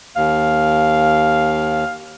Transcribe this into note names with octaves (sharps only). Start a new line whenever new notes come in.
D#2 F5